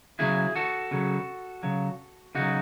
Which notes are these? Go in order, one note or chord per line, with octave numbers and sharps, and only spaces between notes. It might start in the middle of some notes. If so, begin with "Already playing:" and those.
C#3 F#3 E4 G#4
F#4 A4
C#3 F#3
C#3 F#3
C#3 F#3 D#4 F#4